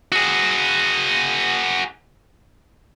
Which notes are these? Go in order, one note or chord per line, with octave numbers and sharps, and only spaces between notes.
F#4 G#4